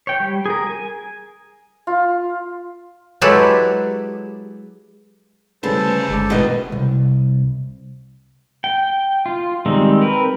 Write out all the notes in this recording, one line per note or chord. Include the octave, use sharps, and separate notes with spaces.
C#5 G5
G3
G#4 A#4
G#5
F4
F#3 G#3 E4 G4 A4 B4
D2 C#3 G3 A3 A4 B4 C5 A5
G1 G#3 D6
E2 B2 D#3 D#5
C2
G5
F4
D#3 G3 G#3 C4 D#4
C4 A#4 B4